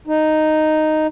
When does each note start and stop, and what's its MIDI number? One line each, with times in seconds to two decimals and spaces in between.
0.07 1.07 63